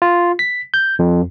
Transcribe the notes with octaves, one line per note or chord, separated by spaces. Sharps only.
F4
B6
G6
F2